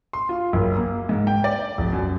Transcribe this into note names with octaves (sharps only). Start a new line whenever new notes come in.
C6
F4
F#1
A#3
G#2
G5
D5
F1
F#2